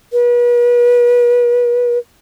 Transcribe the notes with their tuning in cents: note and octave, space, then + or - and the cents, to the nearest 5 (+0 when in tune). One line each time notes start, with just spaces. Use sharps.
B4 -40